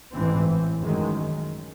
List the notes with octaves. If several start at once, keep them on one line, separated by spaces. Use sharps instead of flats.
A1 G#2 E3 C4
F#2 D#3 G#3